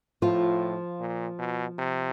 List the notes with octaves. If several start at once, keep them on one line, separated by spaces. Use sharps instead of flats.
A2 F3 F4
A#2
B2
C3